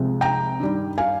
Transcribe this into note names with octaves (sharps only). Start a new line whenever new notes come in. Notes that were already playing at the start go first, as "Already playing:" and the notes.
Already playing: C2 C3 F3 G#3
G5 A#5
G2 D#3 G3
F5 G#5